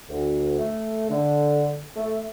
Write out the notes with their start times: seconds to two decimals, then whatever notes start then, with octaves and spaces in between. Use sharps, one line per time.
0.09 D2
0.59 A3
1.10 D3
1.96 A3